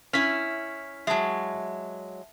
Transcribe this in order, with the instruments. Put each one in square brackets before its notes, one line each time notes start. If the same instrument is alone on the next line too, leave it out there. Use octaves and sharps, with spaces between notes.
[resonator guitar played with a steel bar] C#4 E4 [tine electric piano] F6 B6
[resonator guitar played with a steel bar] F#3 G#3 [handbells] E5 A5